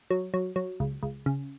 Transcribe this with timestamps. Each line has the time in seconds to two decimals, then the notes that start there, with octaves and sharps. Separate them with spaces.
0.11 F#3
0.34 F#3
0.56 F#3
0.80 C#2
1.03 C#2
1.26 C#3